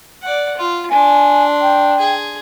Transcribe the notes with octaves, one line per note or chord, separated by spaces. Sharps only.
D5 F#5
F4
D4 G#5 C6
G5
G#4